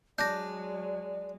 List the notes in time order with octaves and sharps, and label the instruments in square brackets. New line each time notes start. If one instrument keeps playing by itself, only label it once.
[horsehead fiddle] F#3 G#3 [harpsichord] D4 [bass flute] D5 [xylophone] G6 A#6